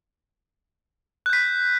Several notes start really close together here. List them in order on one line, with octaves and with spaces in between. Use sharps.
F#6 G6 B6